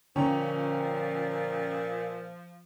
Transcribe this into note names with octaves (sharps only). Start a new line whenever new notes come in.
A#2 D3 F3 C#4 G5 A#5